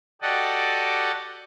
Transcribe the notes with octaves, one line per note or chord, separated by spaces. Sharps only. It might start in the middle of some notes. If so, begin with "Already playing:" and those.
F#4 G4 A4 D5 D#5 F#5